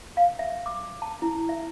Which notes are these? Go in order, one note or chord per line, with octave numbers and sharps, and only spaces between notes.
F5
E5
D6
A5
E4
E5